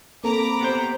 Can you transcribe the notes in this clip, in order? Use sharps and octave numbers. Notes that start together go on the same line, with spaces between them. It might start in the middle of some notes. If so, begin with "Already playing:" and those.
A#3 C4 A4 A#5 B5 D6
B3 G4 C5